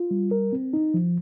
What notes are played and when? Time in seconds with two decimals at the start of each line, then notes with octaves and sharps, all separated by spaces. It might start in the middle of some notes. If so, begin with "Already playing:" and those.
Already playing: F4
0.11 G3
0.31 A#4
0.53 C4
0.73 D#4
0.94 F3